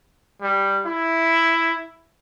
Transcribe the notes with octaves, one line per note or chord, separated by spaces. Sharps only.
G3
E4